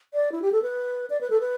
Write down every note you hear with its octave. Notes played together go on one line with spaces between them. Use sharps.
D5
E4
G4
A4
B4
D5
B4
A4
B4